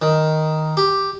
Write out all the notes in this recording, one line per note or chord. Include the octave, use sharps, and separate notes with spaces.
D#3
G4